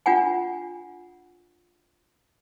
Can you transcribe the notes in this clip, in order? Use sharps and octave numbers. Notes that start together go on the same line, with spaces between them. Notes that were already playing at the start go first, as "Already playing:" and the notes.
D4 F4 F#5 G#5